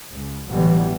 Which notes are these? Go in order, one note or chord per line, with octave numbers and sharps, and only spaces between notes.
C#2
A1 B2 D3 E3 F#3 G3